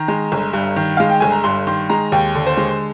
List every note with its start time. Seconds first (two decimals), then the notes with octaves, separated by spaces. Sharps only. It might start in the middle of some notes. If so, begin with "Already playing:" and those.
Already playing: D#3 A#5
0.08 G#3
0.32 G1
0.53 G2
0.76 D#3
0.97 G#3 F5
1.10 G5
1.20 G1 G#5
1.32 A#5
1.44 G2 C6
1.67 D#3 C6
1.89 G#3 A#5
2.12 D#2 G5
2.35 D3
2.46 C5
2.57 G#3